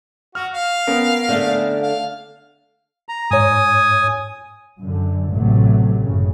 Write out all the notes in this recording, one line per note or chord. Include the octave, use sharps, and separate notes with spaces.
F#4 F6
F5
B3 C#4 A#4
D3 A3
F5
A#5
G#2 C#5 G#5 D#6
F#2 D3
A1 C3 F#3 A3
F#1 F#2 C#3